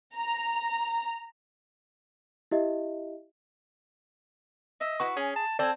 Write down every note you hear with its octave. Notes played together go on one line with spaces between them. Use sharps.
A#5
E4 G4 D#5 E5
D#5 E5
E4 F#4 B4 C#6
C#4 G#4
A5
C4 A4 D5 G#5